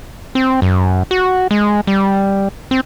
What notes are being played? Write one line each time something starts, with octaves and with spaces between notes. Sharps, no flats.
C4
F#2
F#4
G#3
G3
C4